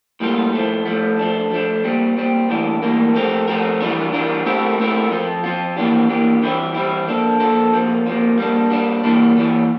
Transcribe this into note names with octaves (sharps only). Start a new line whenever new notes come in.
A2 G3 A#3 F4
A2 F3 A3
A2 F3 A3
F3 A3 D4
F3 A3 D4
A#2 G3 C4
A#2 G3 C4
A2 E3 G3 A#3 D4
A2 E3 G3 A#3 D4
F3 A3 C4 G4 A#4
F3 A3 C4 G4 A#4
E3 G3 D4 F4 A#4
E3 G3 D4 F4 A#4
A3 C4 E4 G4 A#4
A3 C4 E4 G4 A#4
F3 C4 F4
F3 C4 F4
E3 A#3 D4 G4
E3 A#3 D4 G4
E3 G3 C4 E4 G4
E3 G3 C4 E4 G4
F3 A#3 D4 A4
F3 A#3 D4 A4
C3 F3 A#3
C3 F3 A#3
G3 A#3 D4
G3 A#3 D4
E3 G3 A#3
E3 G3 A#3